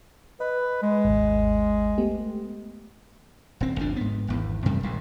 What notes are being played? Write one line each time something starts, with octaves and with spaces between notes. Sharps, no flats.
B4 D#5
G#3
G#1 D#2
A3 B3 G4
D#1 C4
G1 G2 F3 D4
G#2 B3
G#1 E2 G#2
F#2 C3 G3 A3
D#1 B1 F2 G#2